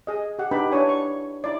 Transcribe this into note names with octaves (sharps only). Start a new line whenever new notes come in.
G#4 D#5
G4 F#5
D4 D#4 G4 B4 B5
D4 E4 C#5 G#5
C#6
D#4 E4 D5